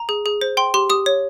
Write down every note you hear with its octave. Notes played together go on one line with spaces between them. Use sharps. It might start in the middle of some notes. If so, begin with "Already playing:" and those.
Already playing: A#5
G#4
G#4
C5
G5 C6
G4 C6
G4 D#6
C#5